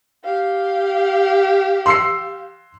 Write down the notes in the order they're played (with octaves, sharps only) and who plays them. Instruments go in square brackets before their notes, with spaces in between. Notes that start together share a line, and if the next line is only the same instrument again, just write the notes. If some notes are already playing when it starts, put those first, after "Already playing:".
[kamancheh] G4 F5
[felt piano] C6 E6 C7